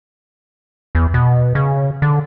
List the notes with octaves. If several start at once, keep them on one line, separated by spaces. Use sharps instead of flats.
E2
B2
C#3
D3